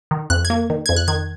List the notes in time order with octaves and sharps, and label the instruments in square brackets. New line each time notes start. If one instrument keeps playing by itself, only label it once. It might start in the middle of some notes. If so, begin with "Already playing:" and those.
[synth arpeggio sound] D#3
F2 F#6
G#6
A#3
D#3
F2 G#6
F#6
D#3 G#6